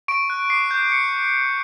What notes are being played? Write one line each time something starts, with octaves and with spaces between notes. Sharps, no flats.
C#6 D7
F#6
D6 C7
G6
C#7